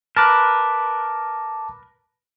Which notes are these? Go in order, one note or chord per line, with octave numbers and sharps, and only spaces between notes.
A#4 B4 A5 D6